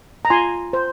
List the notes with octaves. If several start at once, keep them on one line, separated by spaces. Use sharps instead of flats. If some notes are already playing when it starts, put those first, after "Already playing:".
A#5
F4 G#5 C6
C5